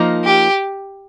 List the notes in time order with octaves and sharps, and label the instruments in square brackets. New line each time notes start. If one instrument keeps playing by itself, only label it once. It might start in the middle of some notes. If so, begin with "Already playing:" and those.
Already playing: [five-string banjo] F3 A#3 D#4
[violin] G4